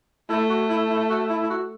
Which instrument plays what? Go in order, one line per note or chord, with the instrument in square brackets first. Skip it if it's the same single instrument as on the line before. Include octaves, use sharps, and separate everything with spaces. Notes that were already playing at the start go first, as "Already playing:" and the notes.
[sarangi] A3 [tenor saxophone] E4
[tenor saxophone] F#4
E4
E4
F#4
E4
E4
F#4